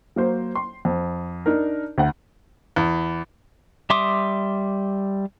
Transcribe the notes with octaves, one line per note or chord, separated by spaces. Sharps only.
F#3 A#3 C5
C6
F2
D4 D#4 A#4
D2 F#5
E2
G3 E5 C6 D6 D#6